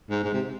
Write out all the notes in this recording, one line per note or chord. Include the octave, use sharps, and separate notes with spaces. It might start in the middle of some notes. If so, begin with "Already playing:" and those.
G#2
G#2
C3